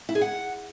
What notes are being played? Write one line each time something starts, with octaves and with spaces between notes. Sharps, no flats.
E4
G#4
F#5